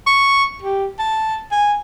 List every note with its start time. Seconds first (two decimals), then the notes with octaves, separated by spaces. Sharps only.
0.07 C#6
0.62 G4
0.99 A5
1.52 G#5